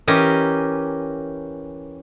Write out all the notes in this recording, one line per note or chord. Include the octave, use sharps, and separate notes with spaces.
E3 C#4 G4 A#4 D#5 A#5